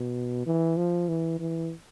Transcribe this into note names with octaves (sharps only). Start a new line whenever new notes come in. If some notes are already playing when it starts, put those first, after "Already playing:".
Already playing: B2
E3
F3
E3
E3